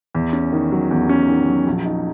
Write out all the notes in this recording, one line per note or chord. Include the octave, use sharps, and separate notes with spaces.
E2
C#4
D#3
F#3
E2
C#4
D#3
F#3
A#1
D#4